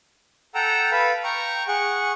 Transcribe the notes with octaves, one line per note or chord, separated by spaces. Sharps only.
A4 F#5 G5 A#5 E6
A4 B4 F5 B5
G5 A#5 C#6
G#4 F#5 C#6